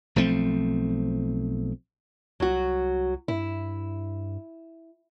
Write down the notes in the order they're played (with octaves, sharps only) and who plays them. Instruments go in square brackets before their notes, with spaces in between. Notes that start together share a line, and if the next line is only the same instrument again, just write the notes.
[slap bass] B1 F3 A3 C4
[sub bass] C2 [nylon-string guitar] F#3 F#4
[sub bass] G2 [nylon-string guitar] E4